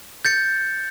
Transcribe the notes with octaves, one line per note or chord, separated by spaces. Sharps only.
G6 A6 C#7